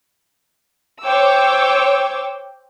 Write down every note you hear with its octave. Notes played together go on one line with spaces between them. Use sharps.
C5 C#5 G5 D6 E6